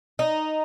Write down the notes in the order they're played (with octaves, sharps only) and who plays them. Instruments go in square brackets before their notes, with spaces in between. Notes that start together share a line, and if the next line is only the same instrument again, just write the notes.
[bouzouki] D#4